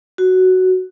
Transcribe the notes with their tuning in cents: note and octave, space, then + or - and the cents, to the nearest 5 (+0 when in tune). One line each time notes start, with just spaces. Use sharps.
F#4 +5